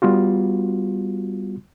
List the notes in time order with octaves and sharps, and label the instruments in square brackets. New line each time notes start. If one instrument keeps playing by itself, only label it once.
[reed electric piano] G3 B3 F4 F#4